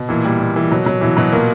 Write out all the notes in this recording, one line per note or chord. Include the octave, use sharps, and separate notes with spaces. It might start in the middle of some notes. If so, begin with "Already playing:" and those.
Already playing: B2
A#2 E3
A#2 G3
A#2
A#2 E3
B2 F#3
B2 F#3
B2 E3
B2 F#3
A#2 A#3